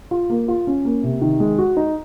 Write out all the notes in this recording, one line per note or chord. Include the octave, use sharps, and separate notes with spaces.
F4
A#3
F4
C#4
A#3
C3
D#3
G#3
F#4
D#4